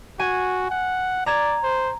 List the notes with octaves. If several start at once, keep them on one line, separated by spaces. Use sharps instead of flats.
F#4 G#5
F#5
D5 A#5 G#6 E7
C5